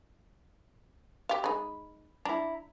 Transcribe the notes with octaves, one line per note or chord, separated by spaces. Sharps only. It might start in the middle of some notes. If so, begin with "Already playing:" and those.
G4 F5
G#3 D#4 B5
D4 E4 A#5